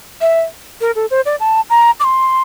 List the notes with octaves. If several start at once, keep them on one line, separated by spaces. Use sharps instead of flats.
E5
A#4
A4
C5
D5
A5
A#5
D6
C6